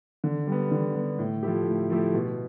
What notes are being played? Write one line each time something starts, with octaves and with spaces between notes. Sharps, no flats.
D3
G3 B3
D3
G3 B3
A2
F3 A3 E4 G4
A2
F3 A3 E4 G4
B2